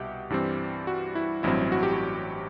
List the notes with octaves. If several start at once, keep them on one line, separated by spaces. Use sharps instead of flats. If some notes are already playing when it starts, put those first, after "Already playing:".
Already playing: C2 B2 G4 E5 F#5
G2 E3 G3 C4
F#4
E4
A1 G2 F#3 C4 E4
F#4
G4
F#4